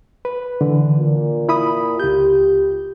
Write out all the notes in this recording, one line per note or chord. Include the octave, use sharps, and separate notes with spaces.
B4
D3 E3
A#2
E4 B5 D#6
C#2 F4 G4 G6